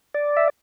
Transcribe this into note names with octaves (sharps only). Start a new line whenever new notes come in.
D5
E5